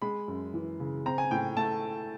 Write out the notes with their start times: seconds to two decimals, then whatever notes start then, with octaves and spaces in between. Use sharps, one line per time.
0.02 G#3 B5
0.28 F#2
0.54 E3
0.80 C#3
1.06 C4 A#5
1.18 G#5
1.31 A2 G5
1.57 A3 A5